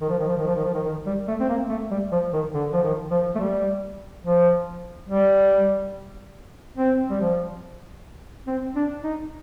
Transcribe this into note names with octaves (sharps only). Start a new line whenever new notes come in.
D#3
F3
D#3
F3
D#3
F3
D#3
F3
D#3
D#3
G3
A3
C4
A#3
A3
G3
F3
D#3
D3
F3
D#3
F3
A3
G3
F3
G3
C4
G3
F3
C4
D4
D#4